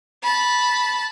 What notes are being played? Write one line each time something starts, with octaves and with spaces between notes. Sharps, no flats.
A5 B5